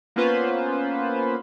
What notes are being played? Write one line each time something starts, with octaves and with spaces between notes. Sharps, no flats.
A#3 B3 C#4 F4 B4 C5